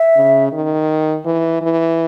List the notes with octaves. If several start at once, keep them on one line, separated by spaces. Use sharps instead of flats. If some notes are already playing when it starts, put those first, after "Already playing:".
Already playing: E5
C#3
D#3
E3
E3